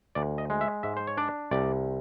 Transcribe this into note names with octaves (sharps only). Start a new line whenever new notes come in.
D2 D5
D#5
G#3
E5
G#2 E5
C5
C#5
D4 D5
C2 D5